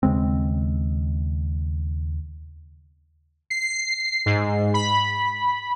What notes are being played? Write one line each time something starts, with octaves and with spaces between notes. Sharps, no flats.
D#2 C#3 G#3 C4
C7
G#2
B5